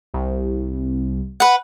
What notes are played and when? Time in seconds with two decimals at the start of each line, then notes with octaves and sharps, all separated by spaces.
0.14 C2
1.40 B4 F#5